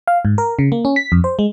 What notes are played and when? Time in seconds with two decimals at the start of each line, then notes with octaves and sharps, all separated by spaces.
0.08 F5
0.25 G#2
0.38 A#4
0.59 C#3
0.72 A#3
0.85 C#4
0.96 B6
1.12 F2
1.24 C5
1.39 G#3